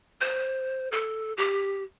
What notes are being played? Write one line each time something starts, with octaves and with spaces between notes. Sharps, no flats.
C5
A4
G4